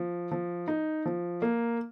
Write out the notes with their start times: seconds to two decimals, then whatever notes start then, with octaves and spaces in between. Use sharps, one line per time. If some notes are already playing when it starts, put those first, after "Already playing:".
Already playing: F3
0.31 F3
0.68 D#4
1.06 F3
1.42 A#3